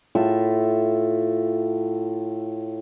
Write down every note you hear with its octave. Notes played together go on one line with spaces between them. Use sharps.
A2 F4 A4 E5